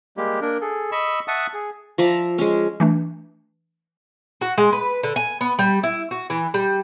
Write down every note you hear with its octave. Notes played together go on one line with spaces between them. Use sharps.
G3 G#3 A#3 G4
A#3 D4 A#4
G#4 A4
D#5 B5 C#6 E6
E5 F#5 A5 C#6 D#6
G#4
F3 D5 E5 A#5
G#3 C#4
E3 A3 D4
F#4
G#3
B4
D3
G#5
B3
G3
E4
F#4
E3
G3